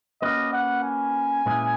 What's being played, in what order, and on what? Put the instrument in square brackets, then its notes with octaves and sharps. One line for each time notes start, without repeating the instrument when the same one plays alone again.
[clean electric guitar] A#3 C#4 F#4 B4 [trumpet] D#5
[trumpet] F#5
G#5
[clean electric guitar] A#2 G#3 C#4 E4 B4